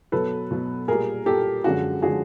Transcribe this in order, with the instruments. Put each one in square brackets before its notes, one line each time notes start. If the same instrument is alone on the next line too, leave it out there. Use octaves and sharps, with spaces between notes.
[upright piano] B2 F#3 A4 B4
B2 F#3
A#2 G3 G#4 A#4
A#2 G3 G4 A4
F#2 D3 F3 G#3 F#4 G#4
D3 F3 G#3 F#4 G#4